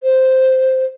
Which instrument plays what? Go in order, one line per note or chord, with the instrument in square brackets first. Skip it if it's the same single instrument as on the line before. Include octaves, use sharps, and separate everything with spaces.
[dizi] C5